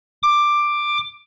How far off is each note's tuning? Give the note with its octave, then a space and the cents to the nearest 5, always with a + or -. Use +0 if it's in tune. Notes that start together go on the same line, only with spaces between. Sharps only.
D6 +10